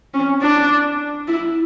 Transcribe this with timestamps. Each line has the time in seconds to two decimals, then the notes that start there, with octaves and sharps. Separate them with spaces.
0.14 C#4
0.41 D4
1.28 E4